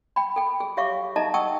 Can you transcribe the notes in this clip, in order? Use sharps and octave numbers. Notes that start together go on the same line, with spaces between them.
G5 B5
A4 G5
G#4
G4 C#5 E5 F5 C#6 D6
D#4 A4 D#5 E5 A5 A#5
F#5 G5 A5 C#6 D#6 E6